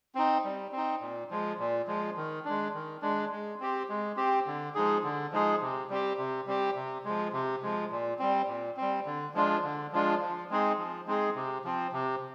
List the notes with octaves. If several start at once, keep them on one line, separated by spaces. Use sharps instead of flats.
C4 D#4
G3
C4
D#4
A#2
F3 G#3
A#2
F3 G#3
D#3
G#3 D4
D#3
G#3 D4
G#3
C4 G4
G#3
C4 G4
D3
F3 G#3 D#4 G#4
D3
F3 G#3 D#4 G#4
C3
G3 C4 G4
C3
G3 C4 G4
C3
F3 G#3
C3
F3 G#3
A#2
G3 C4
A#2
G3 C4
D3
F3 G#3 D4 F4
D3
F3 G#3 D4 F4
F3
G#3 C4 D#4 G#4
F3
G#3 C4 D#4 G#4
C3
F3 C4
C3